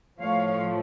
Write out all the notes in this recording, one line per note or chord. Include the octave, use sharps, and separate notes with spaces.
A2 F3 A3 C#5 F5